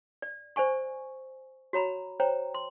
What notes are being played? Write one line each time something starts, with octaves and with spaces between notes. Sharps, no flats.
D5
C5 D5 G#5 C#6
F#4 C#5 A#5 B5
C5 C#5 G5 A#5
C6